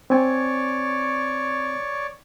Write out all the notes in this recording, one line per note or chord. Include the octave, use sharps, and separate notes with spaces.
C4 C#5 D5 G#5